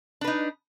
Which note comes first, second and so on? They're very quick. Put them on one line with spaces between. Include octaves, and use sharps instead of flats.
D4 B4 D#4